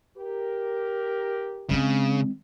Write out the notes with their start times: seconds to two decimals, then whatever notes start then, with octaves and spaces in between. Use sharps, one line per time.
0.17 G4 A#4
1.70 C#3 G#3 C4